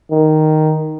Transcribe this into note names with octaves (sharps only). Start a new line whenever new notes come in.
D#3